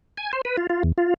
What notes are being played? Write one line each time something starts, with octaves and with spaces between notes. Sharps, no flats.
G#5
C5
B4
F4
F4
E2
F4